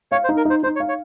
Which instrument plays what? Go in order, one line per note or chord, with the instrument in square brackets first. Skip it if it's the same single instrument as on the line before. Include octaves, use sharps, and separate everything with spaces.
[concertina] C#5 [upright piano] F5
[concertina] C5
[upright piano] D#4
[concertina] A#4
[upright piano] D#4 [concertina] C5
[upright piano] D#4 [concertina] C5
[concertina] C#5
[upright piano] F5
[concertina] C#5